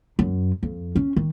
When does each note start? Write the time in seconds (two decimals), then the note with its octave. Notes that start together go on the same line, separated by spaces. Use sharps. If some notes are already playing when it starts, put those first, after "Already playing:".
0.19 F#2
0.63 F2
0.96 C#4
1.16 D#3